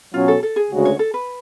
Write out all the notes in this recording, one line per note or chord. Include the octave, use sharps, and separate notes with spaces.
B2 F#3 C#4 F4
A4
A4
G#4
D2 C#3 G#3 C#4 F#4
C#5
A4
B4